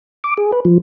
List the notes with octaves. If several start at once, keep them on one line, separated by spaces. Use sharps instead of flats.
D6
G#4
B4
F3